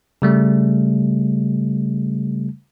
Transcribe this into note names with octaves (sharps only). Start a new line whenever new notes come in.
C#3 G3 A3